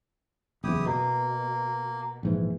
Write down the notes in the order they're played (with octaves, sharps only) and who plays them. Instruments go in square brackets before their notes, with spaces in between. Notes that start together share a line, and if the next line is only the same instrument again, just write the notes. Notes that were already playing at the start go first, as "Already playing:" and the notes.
[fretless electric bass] F#1 E2 [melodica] E4 G4 D#6
[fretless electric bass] B2 [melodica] A#3
[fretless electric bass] A#1 G#2 E3